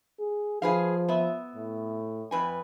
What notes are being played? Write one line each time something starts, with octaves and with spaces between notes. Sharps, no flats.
G#4
F3 G#4 B4 F5
B3 E5
A2
F2 B4 G#5